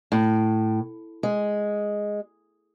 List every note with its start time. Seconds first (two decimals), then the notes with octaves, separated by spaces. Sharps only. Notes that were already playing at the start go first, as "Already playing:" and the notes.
0.12 A2
1.23 G#3